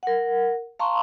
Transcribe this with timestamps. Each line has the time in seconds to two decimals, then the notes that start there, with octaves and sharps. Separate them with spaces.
0.03 A#4 F#5
0.79 F5 A5 A#5 C6 C#6